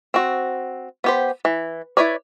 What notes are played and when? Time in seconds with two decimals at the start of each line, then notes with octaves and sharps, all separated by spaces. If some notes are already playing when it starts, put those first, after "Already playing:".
0.14 C4 F#4
1.04 B3 G4 C5
1.45 E3
1.97 E4 G#4 B4 C#5 D5